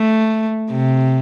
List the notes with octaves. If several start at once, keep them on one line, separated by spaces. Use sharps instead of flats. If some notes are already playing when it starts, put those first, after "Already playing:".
Already playing: A3
C3